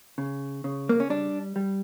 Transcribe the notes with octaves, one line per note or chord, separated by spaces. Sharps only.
C#3
C#3
A#3
C#4
G3 D4
G3